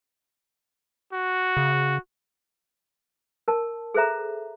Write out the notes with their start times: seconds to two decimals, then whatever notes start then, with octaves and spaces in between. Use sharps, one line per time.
1.13 F#4
1.57 C#3
3.48 A#4 A5
3.94 G#4 A4 C5 E5 A#5